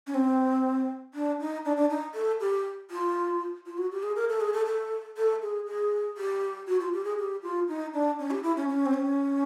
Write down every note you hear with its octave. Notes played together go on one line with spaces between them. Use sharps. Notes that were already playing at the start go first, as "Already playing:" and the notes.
C#4
C4
D4
D#4
D4
D4
D#4
A4
G4
F4
F4
F#4
G4
G#4
A#4
A4
G#4
A4
A4
A4
G#4
G#4
G4
F#4
F4
G4
G#4
G4
F4
D#4
D4
C#4
G4
E4
C#4
C#4
C4
C#4